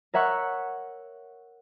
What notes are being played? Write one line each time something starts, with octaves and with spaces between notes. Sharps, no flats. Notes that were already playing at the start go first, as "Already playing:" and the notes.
A#4 C#5 E5 F#5 C#6